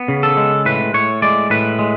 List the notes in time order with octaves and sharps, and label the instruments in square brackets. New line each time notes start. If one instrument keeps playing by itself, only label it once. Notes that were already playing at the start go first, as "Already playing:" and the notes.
Already playing: [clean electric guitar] B3
C#3
A4
G#3
A2 B4
A2 C#5
G#3 D5
A2 B4
G#3